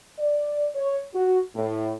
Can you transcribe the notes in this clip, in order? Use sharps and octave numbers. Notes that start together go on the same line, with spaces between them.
D5
C#5
F#4
A2